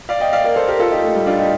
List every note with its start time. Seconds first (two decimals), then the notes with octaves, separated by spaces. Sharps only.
0.09 D5 F5
0.20 D#5 G5
0.33 D5 F5
0.44 A#4 D5
0.56 A4 C5
0.68 G4 A#4
0.80 F4 A4
0.91 D#4 G4
1.04 A3
1.15 G3
1.26 D4 F4
1.39 D#4 G4